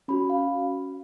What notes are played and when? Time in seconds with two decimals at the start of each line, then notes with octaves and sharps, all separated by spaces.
0.08 C#4 F#4 B5
0.30 F5